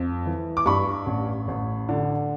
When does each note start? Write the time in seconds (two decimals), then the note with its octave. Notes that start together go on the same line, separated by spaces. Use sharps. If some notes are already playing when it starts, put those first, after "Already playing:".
Already playing: F2
0.26 E3
0.57 D6
0.66 G2 B5 C#6
1.06 A1
1.48 A1
1.89 D3